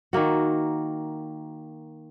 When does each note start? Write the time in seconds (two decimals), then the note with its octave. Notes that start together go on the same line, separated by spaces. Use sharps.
0.13 D#3 A#3 F#4